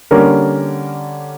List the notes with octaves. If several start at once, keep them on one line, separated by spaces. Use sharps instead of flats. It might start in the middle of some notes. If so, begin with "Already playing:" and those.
D3 G3 A#3 C#4 A#4